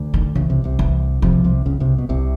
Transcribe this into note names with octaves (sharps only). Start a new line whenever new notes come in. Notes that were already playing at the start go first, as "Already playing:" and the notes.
Already playing: D2 D3
D#3
C#2 C#3 E3
C2 C3
C2 C3
E3
C2 C3 F3
C2 C3
C#2 C#3
C2 C3
B2
C2 C3